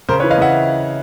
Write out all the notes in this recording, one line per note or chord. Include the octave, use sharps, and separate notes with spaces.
C#3 A#4 C5
B4 C#5
E3
D#5 F5
C#3 E5 F#5